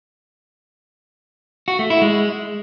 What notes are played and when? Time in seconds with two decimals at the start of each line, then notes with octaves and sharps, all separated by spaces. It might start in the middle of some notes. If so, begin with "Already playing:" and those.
1.68 F#4
1.79 A3
1.90 E4
2.02 G#3